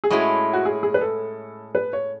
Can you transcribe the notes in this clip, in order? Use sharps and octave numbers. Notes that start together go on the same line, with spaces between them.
G#4
A2 G#3 C#4 E4 F#4
F#4
G#4
G#4
B4
A4
B4
C#5